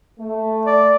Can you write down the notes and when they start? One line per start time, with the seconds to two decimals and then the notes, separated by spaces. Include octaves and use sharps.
0.19 A3
0.66 D5